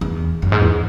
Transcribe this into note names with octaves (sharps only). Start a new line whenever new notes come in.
E2
F#2
G#2
E2